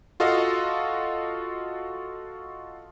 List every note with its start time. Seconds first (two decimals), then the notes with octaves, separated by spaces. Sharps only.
0.20 F4 F#4 A4 D#5 F5